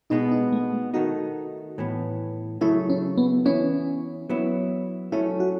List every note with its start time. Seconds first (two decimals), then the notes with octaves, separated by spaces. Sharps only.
0.10 B2 G#3 B3 D#4
0.32 D#4
0.52 A3
0.94 D#3 A3 D#4 F#4
1.78 A2 E3 B3
2.61 C#3 F#3 A3 E4
2.90 C#4
3.18 B3
3.45 E3 B3 C#4 E4
4.29 F#3 B3 E4
5.12 F#3 A3 C#4 E4
5.40 F#4